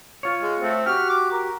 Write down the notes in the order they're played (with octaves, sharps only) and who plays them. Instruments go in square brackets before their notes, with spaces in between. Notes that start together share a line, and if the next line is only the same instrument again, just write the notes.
[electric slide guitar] F4 C#5
[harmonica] G#3
A3 C4
[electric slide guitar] F#4 G4 [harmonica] F6
[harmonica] D6
A#4